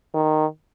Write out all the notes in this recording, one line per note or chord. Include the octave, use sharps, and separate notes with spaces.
D#3